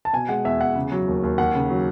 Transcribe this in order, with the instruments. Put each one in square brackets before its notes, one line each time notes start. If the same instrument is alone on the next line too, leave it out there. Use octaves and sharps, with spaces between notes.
[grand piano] A5
B2 G#5
G#3 F#5
E2 E5
E2 F#5
C#3
F#3
D#2
D#2
D#2 F#5
C#3
F#3